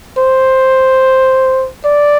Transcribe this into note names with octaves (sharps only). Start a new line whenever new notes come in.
C5
D5